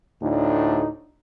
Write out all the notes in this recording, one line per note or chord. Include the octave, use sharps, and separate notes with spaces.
D2 A2 D4 D#4